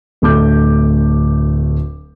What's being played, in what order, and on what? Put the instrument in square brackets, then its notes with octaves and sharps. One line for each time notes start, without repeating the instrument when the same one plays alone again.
[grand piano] D1 A3 D6 G6